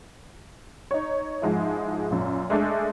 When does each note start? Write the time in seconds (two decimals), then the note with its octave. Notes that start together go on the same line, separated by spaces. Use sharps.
0.91 D#4 C#5
1.42 G#2 F3 G#3 E4
2.11 F#2 A#2
2.50 G#3 A3 D4